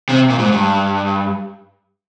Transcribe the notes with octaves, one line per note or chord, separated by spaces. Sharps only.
C3
A#2
G#2
G2